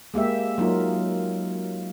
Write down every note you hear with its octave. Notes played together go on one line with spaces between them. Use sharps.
G#3 A#3 G4 E5
F#3 A#3 D#4 F4 A#4